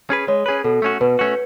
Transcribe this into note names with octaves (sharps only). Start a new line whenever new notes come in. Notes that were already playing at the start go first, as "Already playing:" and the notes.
C#4 G#4 B4
G#3 C#5
C#4 G#4 B4
B2 A4
A3 C#4 F#4
B2 B4
A3 C#4 F#4